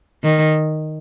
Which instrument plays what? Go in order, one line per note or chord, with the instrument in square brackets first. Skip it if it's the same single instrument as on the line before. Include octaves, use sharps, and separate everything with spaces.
[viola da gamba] D#3